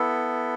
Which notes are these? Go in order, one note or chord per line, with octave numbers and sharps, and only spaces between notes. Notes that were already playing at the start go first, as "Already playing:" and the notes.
Already playing: B3 E4 A4